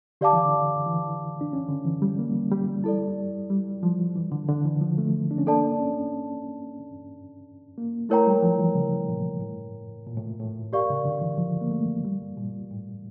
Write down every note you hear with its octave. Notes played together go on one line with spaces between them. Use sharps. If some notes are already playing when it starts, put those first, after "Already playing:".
D3 G4 D5 F5 A5 D6
E3
D3
E3
D4
C#4
D3
E3
G3
A#3
G3
E4 A4 D5
G3
F3
E3
D3
D3
E3
F3
A3
D4
C#4
A#3 D4 A4 D5 A5
C#4
A#3
A3 E4 A#4 C#5 G5 A#5
G3
F3
E3
C#3
A#2
A2
A#2
A2
A2
G4 A#4 D5 F5 C#6
C#3
D3
E3
F3
A#3
A3
G3
A#2
A2